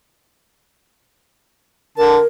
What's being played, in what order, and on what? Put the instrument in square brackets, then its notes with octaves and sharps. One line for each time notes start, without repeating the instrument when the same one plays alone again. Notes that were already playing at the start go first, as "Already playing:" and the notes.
[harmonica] D3 A5 [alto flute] A#4